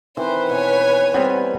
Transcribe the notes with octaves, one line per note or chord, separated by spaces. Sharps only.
D#3 E3 C4 B4 C5
B2 C#5 G#5
G3 B3 C4